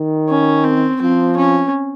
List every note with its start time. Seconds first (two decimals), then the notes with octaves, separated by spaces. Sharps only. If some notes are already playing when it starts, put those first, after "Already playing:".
Already playing: D#3
0.29 C#4
0.64 C4
1.01 F3 C4
1.37 C#4